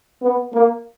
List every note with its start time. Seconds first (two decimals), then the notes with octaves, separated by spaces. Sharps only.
0.22 B3
0.53 A#3